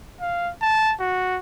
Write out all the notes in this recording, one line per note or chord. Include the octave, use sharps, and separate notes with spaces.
F5
A5
F#4